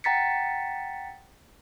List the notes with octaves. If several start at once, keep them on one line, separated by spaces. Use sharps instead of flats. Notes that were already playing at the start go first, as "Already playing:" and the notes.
F#5 G5 A#5 A6 B6 C#7